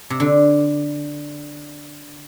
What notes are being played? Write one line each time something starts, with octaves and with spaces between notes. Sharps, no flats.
C3
D3